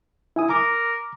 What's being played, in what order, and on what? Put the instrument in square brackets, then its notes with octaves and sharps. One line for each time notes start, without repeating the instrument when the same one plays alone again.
[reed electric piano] E4 G#5 D#6
[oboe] A#4 [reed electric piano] A#5 D6